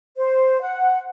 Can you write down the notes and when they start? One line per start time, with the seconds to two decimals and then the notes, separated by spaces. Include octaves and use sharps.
0.17 C5
0.61 F#5